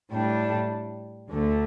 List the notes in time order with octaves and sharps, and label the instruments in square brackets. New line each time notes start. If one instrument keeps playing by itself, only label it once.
[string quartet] A2 G3 D4
D2 D3 A3